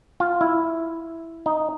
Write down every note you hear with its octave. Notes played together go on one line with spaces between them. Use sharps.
F4
E4
D#4